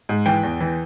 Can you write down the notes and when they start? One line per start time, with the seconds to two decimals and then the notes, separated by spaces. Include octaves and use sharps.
0.09 G#2
0.26 E3 G5
0.43 E2
0.61 E3